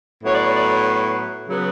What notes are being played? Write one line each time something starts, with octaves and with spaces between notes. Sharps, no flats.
A2 F#3 B3 C#5
D5
C#5
D5
C#3 F#3 B3